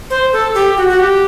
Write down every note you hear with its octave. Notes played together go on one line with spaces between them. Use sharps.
C5
A4
G4
F#4
F#4
G4